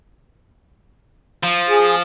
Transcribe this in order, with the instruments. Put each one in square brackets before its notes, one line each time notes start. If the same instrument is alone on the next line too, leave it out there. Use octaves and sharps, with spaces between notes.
[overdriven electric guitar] F3
[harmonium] G#4